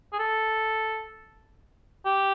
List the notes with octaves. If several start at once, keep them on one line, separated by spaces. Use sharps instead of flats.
G#4
A4
G4